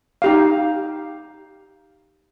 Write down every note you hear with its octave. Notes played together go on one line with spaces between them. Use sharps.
D#4 G4 F5